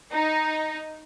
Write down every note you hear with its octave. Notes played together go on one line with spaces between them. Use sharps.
D#4